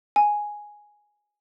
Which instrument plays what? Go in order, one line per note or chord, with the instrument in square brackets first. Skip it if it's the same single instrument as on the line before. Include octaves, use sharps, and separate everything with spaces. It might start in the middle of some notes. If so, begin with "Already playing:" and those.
[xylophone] G#5